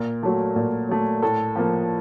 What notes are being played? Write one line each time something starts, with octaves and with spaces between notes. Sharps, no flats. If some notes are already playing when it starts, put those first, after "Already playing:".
Already playing: A#2 A#4
F#3 A3
A#2
F#3 A3
A2 A4
F3 A#3